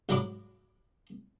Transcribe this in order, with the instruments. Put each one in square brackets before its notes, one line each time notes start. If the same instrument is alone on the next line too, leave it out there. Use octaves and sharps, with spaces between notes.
[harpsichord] G#2 F#3 E5 B5 D6